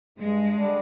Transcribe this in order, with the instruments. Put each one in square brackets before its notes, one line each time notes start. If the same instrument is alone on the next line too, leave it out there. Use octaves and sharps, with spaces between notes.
[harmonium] G2 [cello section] G#3
[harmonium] D3 G3 D4